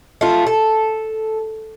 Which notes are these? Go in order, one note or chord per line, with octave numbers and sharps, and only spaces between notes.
A3 F4
A4